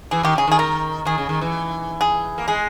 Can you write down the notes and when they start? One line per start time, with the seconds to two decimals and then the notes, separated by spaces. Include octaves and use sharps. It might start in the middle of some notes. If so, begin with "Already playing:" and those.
0.11 E3 G#4
0.23 D#3 G4
0.35 C#3 G#4
0.47 D#3 G#4
0.59 A#4
1.05 D#3 G#4
1.18 C#3
1.29 D#3
1.41 E3
2.01 G#4
2.38 A#3
2.48 G#3 G#4